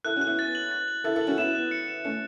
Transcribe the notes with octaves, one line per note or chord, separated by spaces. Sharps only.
E4 A4 F#6
C#4 F#4
F#6
B3 E4
A6
F#7
A6
F#7
E4 A4 A6
E4 A4
F#7
C#4 F#4
B3 E4 E7
F#6
C#7
E7
A3 C#4 C#7